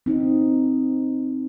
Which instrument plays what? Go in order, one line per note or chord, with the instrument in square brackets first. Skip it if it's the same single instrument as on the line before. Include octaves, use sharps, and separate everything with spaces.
[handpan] C4 D#4